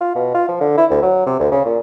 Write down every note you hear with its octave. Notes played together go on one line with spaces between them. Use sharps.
F4
B2
F4
F3
D3
E4
D2
F#3
C3
D2
C#3
A#2